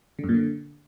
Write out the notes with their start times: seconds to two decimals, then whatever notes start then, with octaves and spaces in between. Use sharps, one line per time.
0.19 D3
0.24 F#2
0.29 A#2
0.34 D3